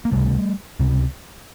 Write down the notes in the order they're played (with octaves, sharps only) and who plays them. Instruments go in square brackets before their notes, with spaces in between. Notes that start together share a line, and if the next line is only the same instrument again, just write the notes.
[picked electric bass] A#3
C#2 C3 G3 A3
C#2 C3